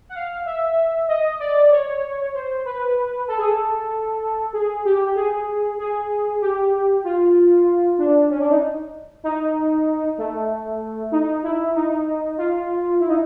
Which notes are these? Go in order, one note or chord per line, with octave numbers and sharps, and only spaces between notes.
F#5
F5
E5
D#5
D5
C#5
C5
B4
A4
G#4
A4
G#4
G4
G#4
G#4
G4
F4
D4
C#4
D4
D#4
D#4
A3
D#4
E4
D#4
F4
E4
D#4